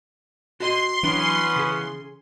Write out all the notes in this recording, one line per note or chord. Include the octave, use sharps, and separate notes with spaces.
F#4 D#5 C6
E3 F#3 B3 C#4 D4
C#3 G#4